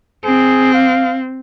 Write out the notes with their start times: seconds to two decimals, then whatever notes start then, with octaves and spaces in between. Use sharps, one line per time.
0.25 C4 G#4
0.74 F5